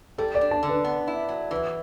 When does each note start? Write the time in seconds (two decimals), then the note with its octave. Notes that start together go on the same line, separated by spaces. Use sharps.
0.18 G3 A4
0.35 D5
0.41 D4
0.51 A5
0.63 D3
0.69 B4
0.84 B3
1.07 E4
1.29 F#3
1.51 E3 B4